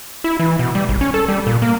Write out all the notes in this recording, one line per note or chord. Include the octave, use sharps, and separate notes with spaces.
E4
E3
B2
G3
G#1
C#4
A4
G3
A#2
A#3